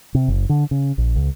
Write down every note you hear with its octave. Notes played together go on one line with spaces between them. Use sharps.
C3
F#1
D3
C#3
A#1
C#2